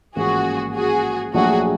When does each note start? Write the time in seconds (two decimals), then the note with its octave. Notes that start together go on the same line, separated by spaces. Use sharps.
0.16 A1 G#2 F3 A#3 C#4 F#4 G#4
0.75 F#4 G#4
1.34 A#1 A#2 F#3 A3 D4 F#4 G#4